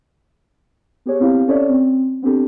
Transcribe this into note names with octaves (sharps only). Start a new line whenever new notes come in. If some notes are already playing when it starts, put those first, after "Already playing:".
B3 G4 G#4 C#5
B3 C4 E4 G4 F5
C#4 A4 C#5 D5 E5
C4
B3 C4 D4 G4 A4